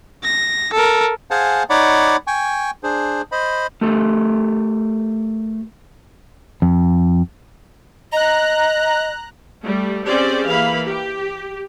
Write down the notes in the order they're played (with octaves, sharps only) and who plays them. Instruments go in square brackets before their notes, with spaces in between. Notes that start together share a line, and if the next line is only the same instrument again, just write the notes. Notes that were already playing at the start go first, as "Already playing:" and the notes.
[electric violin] A#6
A4 A#4
[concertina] G#4 C5 F5 F#5 G#5 A5
D#4 C#5 D5 F#5 B5 D6
G5 G#5 C#6
D4 G#4 C5
C5 D#5 B5
[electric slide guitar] A3 G4 A4 A#4
[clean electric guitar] F2
[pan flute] D#5 [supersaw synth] A#5 F#6
[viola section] G3 A3
C4 C#4 G4 G#4 C5 D5
E3 A#3 F5 B5
G4